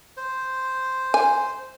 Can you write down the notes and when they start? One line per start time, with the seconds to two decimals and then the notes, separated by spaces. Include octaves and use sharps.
0.17 C5
1.14 G#5